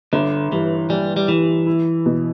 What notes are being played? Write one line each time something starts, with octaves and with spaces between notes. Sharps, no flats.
G1 D3
G2 E3
E3 G3
G3
E3 G3
E4
B2